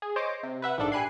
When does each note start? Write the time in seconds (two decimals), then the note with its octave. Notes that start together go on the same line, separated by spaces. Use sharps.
0.02 G#4
0.16 C5 C#5 D#5 D6
0.43 C3
0.62 B4 E5 F#5
0.78 A#1 G#2 D4 A4
0.92 G4 G#5 B5 F#6 G#6 C7